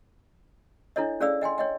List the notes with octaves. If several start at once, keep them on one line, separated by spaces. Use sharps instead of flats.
D4 E4 A4 C#5 D#5
C#4 G#4 A4 D5 F5 E6
D#5 G5 G#5 C6
C#5 D#5 G5